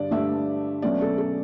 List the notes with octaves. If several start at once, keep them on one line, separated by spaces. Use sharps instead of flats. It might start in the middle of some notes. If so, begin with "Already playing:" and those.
Already playing: G2 D3 D5
G2 D3 A3 E5
B2 F#3 A3 C#4 D5
A4
A4